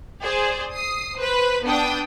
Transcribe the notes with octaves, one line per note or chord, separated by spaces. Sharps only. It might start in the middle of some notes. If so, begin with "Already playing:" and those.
G#4 C5 D5
D#6 C7
B4 C5
B3 D4 G5 D#6